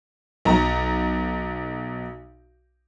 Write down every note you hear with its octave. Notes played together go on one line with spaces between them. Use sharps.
B1 A#5